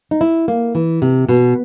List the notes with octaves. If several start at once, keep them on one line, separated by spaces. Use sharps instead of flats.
D#4
E4
A#3
E3
C3
B2